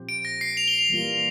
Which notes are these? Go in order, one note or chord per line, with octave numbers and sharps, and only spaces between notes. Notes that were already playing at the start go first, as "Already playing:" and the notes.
Already playing: A#2 F3 C4 G4 C5
D7
A#6
C7
F7
G7
F7
E3 G3 A#3 F4